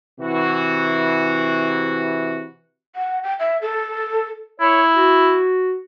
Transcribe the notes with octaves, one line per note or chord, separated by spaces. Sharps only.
C3 E3 F#4
F#5
G5
E5
A4
E4 C#5
F#4